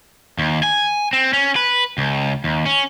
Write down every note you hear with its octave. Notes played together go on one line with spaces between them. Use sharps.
D#2
G#5
C4
C#4
B4
C#2
D#2
C#4